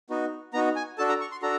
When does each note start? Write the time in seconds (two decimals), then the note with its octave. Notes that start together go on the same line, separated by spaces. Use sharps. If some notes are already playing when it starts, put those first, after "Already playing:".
0.10 B3 D#4 F#4
0.53 B3 D#4 F#4 A#5
0.76 G#5
0.98 D4 F#4 A4 A5
1.09 A#5
1.21 C#6
1.32 C6
1.42 D4 F#4 A4 A#5